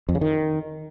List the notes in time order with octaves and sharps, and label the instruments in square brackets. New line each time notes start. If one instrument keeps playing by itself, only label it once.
[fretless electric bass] F2
C#3
D#3